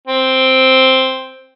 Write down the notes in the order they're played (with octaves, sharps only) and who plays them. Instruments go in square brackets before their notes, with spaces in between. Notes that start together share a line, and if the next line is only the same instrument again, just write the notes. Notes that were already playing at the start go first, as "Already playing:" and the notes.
[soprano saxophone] C4